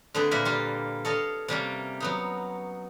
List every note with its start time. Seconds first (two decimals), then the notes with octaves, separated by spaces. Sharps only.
0.14 D3 A3 C4 G#4 B4
0.31 A#2 A#3 A#4 B4 E5
0.45 G3 F4
1.05 A4 C#5 D#5 F5
1.48 C3 G3 A#3 C#4
2.00 F#3 B3 D#4